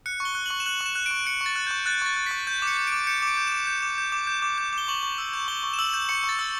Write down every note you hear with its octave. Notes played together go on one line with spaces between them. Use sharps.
F#6 C#7
C#6
G7
F#6
C#6 F#7
E7
F#6 F#7
C#6
E7
F#6
D7
C#6
F#6 C#7
C#6 A6
F#6
C#6 G6
F#6 A6
C#6 A6
F#6
C#6 B6
G6
D6 C#7
G6
D6 D7
G6 C#7
D6 D7
G6
D6 E7
G6
D6
G6
D6
G6
D6
G6
D6
G7
C#6 F#7
C#6
E6
G6
C#6 G7
C#6
E7
E6 F#7
G6 E7
C#6 C#7
C#6
A6
E6